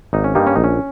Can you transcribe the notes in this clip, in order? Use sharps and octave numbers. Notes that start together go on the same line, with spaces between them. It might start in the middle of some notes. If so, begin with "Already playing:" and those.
G#1 D#4
C#4
G2 G3 A#3 D#4
C#4
A#1 D#4
C#4